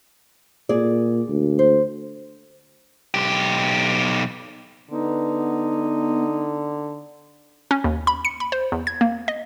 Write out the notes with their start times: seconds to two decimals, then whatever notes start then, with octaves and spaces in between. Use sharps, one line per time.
0.69 A#2 G#4 D5
1.29 D2
1.59 C5
3.14 B1 G4
4.90 D3 B3 D#4
7.71 C#4
7.84 D#2
8.07 B5
8.25 C#7
8.40 B5
8.52 C5
8.72 E2
8.87 G#6
9.01 A#3
9.28 D#5